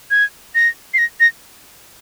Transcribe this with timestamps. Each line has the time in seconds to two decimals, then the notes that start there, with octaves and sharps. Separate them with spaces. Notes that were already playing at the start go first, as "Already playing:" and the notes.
0.11 G#6
0.55 A#6
0.94 C7
0.98 A#6
1.20 A#6